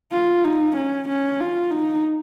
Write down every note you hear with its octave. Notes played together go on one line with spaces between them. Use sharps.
F4
D#4
C#4
C#4
F4
D#4